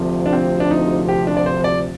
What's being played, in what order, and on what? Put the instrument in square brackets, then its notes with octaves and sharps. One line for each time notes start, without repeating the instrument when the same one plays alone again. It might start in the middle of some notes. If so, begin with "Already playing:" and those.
Already playing: [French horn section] D2 C3 F3
[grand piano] D4
C4
D4
D#4
G4
D4
D5
C5
D5